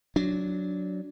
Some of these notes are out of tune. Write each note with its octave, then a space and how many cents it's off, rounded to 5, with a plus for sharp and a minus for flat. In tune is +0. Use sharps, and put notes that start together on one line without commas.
F#3 +0 D4 -10